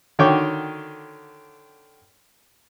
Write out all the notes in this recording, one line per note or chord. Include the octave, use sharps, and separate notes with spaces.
D3 D#3 F#4 C#5 G5 D6